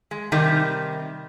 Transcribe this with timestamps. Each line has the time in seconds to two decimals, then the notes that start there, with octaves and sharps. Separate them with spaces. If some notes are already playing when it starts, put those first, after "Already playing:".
0.11 G#3
0.32 C3 D#3 G3